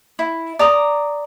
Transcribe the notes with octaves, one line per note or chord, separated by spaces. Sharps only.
E4
D5 A#5 D#6